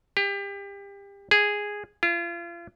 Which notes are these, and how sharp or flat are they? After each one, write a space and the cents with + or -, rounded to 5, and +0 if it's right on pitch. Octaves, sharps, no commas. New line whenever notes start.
G4 +30
G#4 -5
F4 -35